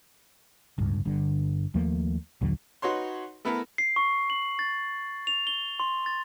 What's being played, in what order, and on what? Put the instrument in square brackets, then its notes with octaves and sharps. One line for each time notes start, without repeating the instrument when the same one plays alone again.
[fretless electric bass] D1 G1 C#2 G2
G1 G2 D3
D#2 F3 A3 A#3
A#1 D#2 D3 F#3
[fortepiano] D#4 F#4 B4 C#5 C6
A3 B3 E4 A4 A#4
[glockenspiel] C7
C#6
F#7
A6
F7
G7
C6
A6